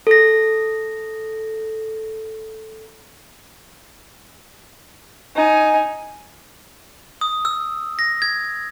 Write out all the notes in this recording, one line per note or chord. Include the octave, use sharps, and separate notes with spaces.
A4 A#6
D#4 G#5
D#6
E6
A#6
G#6